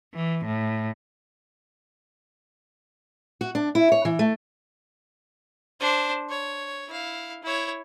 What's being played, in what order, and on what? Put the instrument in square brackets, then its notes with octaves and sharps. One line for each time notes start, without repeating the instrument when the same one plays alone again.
[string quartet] E3
A2
[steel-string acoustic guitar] F#4
D4
E4
C#5
E3
A3
[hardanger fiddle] D4 C5
C#5
E4 F5
E4 C#5